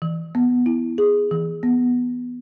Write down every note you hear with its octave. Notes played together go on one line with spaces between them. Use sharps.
E3
B3
E4
G#4
E3
B3